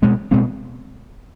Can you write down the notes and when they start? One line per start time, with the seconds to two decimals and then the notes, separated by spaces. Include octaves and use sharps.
0.02 B2 G#3 C4
0.31 B2 G#3 C4